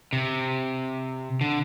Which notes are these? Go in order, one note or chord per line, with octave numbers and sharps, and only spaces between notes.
C3
D3